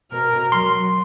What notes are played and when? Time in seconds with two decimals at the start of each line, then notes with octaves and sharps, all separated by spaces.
0.11 B2 A#4 F6
0.52 F#3 C6